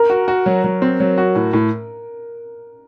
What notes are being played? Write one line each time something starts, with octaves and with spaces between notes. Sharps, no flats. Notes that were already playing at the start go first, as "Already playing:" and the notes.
Already playing: A#4
F#4
F#4
F#3
F#3
C4
F#3
F#4
A2
A2